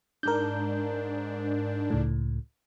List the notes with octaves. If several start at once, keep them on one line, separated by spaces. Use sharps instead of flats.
G#2 D4 A#4 G6
C#2 A2